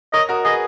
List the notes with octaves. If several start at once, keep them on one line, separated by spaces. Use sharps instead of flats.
A#4 C#5 D#5
F#4 A#4
G#4 B4 D#5